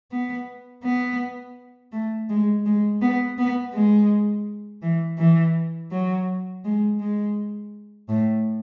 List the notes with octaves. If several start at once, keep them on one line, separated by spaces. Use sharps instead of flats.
B3
B3
A3
G#3
G#3
B3
B3
G#3
E3
E3
F#3
G#3
G#3
A2